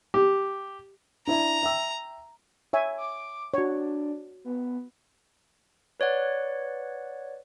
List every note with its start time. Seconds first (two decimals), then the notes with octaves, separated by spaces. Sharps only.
0.14 G4
1.27 D4 E4 D5 A#5
1.63 E5 G5 E6
2.73 C#5 E5 G#5
2.97 D6
3.54 D4 F#4 C#5
4.44 B3
6.00 B4 C#5 D5 F#5